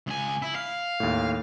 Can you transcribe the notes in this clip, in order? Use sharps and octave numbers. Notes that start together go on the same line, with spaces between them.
C#2 G#5
E4
F5
D#2 A2